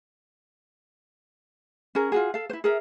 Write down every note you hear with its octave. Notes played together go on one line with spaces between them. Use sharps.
C#4 G#4 A#4
F4 F#4 G#4
A4 F5
E4 C5
G#4 A#4 E5